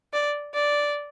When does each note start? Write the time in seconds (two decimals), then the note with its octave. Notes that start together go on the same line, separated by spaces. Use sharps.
0.13 D5
0.54 D5